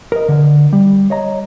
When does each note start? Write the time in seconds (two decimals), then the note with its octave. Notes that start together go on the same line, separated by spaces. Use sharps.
0.12 A#4 D#5
0.29 D3
0.73 G3
1.10 C#5 D#5 A#5